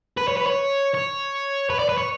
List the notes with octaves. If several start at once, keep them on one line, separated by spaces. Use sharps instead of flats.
B4
C#5
B4
C#5
C#5
B4
D5
B4
C#5